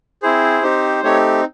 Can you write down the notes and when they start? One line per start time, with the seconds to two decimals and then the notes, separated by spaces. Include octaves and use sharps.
0.23 C4 E4 G#4 C5
0.63 C4 D#4 G4
1.03 A3 C4 D#4 G4 C#5